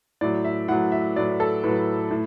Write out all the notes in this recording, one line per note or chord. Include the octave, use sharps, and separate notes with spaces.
A2 F#3 D5
E5
A2 F#3 F#5
E5
A2 F#3 D5
A4
A2 F#3 B4
A2